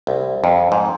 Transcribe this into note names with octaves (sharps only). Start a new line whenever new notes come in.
C2
F2
G#2